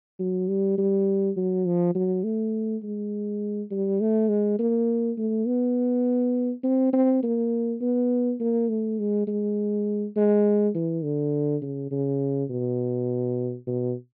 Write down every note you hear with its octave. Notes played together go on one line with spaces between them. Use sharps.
F#3
G3
G3
F#3
F3
F#3
A3
G#3
G3
A3
G#3
A#3
A3
B3
C4
C4
A#3
B3
A#3
A3
G#3
G#3
G#3
E3
D3
C#3
C#3
B2
B2